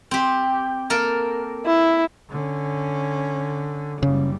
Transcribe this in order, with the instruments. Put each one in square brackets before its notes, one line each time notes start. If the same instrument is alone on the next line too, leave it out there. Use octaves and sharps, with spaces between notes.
[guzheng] C4 G4
A#3 A4 A#4
[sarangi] E4
[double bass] D3 C#4
[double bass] F#1 G3 [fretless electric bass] C#3